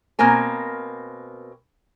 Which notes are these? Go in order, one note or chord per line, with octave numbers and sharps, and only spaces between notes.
B2 A#3 C4 A#4 G#5